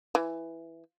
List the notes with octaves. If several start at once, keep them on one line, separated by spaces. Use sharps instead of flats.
E3